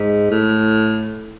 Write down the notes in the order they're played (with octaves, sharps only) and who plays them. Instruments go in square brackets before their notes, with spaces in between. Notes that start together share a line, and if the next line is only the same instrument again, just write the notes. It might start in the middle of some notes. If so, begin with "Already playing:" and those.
Already playing: [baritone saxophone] G#2
A2